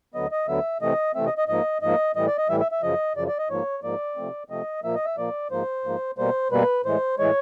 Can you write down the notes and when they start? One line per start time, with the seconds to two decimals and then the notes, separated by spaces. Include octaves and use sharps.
0.14 D2 D3 F#3 B3 D#5
0.32 D#5
0.48 D2 D3 F#3 B3 E5
0.82 C3 E3 A3 C4 D#5
1.15 C3 E3 A3 C4 E5
1.26 D#5
1.38 D#5
1.48 G#2 F3 A#3 D#5
1.82 G#2 F3 A#3 D#5
2.16 A2 E3 G3 D#5
2.27 D5
2.38 D#5
2.49 A2 E3 G3 E5
2.60 E5
2.72 E5
2.83 F#2 C#3 F3 D#5
3.16 F#2 C#3 F3 D5
3.28 D5
3.38 D#5
3.50 G#2 F3 A#3 C#5
3.83 G#2 F3 A#3 D5
4.17 C3 F3 A3 C4
4.50 C3 F3 A3 C4 D#5
4.84 A#2 F3 A#3 E5
4.95 D#5
5.05 E5
5.17 A#2 F3 A#3 D5
5.51 G#2 F3 A#3 C5
5.84 G#2 F3 A#3
6.18 B2 G3 A#3 C5
6.51 B2 G3 A#3 B4
6.85 A2 E3 G#3 C5
7.18 A2 E3 G#3 C#5